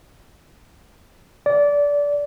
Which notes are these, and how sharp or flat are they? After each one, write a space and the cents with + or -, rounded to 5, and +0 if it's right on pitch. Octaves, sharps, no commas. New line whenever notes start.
D5 -20